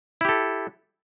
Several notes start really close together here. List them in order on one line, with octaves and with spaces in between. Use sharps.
E4 G4 A4